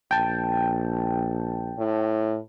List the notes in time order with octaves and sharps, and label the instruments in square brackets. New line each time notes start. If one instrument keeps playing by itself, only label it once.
[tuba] A#1 [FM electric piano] G5 A5
[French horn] A2